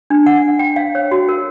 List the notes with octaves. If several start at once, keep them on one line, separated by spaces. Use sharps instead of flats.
D4
F#5
G5
F5
C#5
F#4
A#4